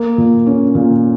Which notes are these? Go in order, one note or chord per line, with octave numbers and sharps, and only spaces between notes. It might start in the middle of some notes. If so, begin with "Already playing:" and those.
Already playing: A#3
A#2
C#4
A#2